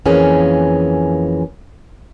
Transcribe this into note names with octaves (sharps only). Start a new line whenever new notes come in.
F2 E3 A#3 C#4 G#4